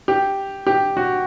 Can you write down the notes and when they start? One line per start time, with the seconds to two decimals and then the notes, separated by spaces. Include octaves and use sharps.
0.08 G4
0.67 G4
0.97 F#4